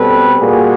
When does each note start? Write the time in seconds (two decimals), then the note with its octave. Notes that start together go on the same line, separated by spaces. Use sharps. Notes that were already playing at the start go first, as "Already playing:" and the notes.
Already playing: B2 G3 C4 A4 B4
0.40 A#2 G3 A#3 F#4 G#4